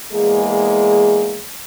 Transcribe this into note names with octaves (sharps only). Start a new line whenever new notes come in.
E2 G#3 A#3 G#4